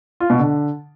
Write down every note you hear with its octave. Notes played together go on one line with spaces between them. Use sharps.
F4
B2
D3